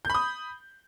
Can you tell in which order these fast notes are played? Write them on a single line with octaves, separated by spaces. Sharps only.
G6 B5 D#6